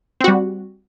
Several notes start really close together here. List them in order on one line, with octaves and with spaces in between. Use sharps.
C4 F#4 G3